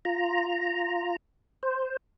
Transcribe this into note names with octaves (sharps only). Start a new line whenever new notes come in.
F4 A#5
C5